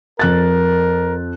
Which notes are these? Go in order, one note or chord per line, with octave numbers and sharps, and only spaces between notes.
F2 A#4 F#6 A6